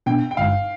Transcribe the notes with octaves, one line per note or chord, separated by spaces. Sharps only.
B2 B3 D4 G5
G5
G1 G2 D3 G#3 F5